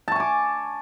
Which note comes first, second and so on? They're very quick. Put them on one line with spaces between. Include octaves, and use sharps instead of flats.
A5 C#6 G#5 D6